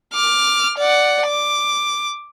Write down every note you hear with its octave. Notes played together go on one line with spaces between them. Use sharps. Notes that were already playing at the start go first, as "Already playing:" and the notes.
D6 F6
D5 F#5
D6